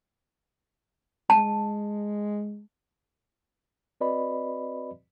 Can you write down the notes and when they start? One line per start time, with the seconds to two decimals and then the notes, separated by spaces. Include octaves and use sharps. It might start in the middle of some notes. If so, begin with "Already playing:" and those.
1.30 G#3 A5
4.01 C4 F#4 B4 D5 D#5 B5